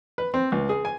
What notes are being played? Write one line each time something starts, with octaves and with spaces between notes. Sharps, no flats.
B4
C4
C#2
G#4
G#5